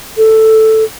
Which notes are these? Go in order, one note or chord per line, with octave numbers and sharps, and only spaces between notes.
A4